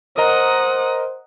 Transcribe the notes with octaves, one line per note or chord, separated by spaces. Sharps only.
A#4 C5 D#5 F#5 A#5 D#6